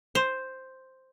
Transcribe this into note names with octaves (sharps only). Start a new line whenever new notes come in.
C5